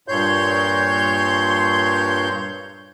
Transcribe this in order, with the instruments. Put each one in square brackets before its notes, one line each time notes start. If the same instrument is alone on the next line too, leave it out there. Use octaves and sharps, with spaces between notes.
[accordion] G2 A#2 C#5 C6 G6